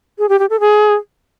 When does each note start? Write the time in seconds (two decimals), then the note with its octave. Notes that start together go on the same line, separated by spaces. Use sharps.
0.19 G#4
0.29 G4
0.39 G4
0.50 A4
0.60 G#4